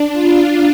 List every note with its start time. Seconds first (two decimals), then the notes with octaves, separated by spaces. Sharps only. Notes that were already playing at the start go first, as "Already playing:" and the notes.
Already playing: D4
0.12 F4